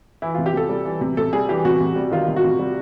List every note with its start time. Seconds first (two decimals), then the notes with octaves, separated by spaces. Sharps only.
0.22 E3 E4
0.34 F4
0.38 C3
0.46 G4
0.53 C3 A4
0.69 G3
0.85 E3
1.01 C3
1.17 C3 A4
1.33 G3 G#4
1.49 E3 G4
1.65 C3 F#4
1.81 C3
1.96 G3
2.11 D#3 F4
2.28 C3
2.36 F#4
2.44 C3
2.59 G3